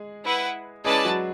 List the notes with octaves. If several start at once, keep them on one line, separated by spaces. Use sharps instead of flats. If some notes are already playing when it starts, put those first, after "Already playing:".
Already playing: G#3 G#4
E4 B4 F#5
G#3 C#4 E4 G#4 B4 D5 A5
F#3 F#4